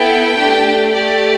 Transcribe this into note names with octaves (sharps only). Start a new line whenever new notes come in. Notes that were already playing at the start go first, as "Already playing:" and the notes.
Already playing: B3 E4 A4 G5
A3 D4 G4
A3 G4 D5